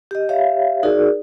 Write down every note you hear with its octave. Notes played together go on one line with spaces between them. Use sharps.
G4 D#5
G4 C#5 E5 F5
D#4 F#4 G#4 A#4 D5